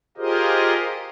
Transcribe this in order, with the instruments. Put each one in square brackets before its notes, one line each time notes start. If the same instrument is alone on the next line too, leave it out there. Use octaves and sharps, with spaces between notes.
[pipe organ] F4 G4 G#4 A#4 C5 D#5